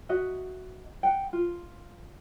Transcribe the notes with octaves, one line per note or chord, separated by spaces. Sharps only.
F#4 D#5 E5
F#5 G5
F4